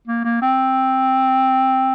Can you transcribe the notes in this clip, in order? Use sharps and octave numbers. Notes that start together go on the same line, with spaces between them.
A#3
A#3
C4